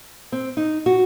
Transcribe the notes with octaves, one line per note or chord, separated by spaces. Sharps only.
C4
D#4
F#4